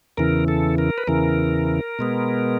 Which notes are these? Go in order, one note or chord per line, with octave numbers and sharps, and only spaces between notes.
E2 C#3 E3 A#4
A4
A#4
B4
E2 C#3 E3 A#4
B2 G#3 B3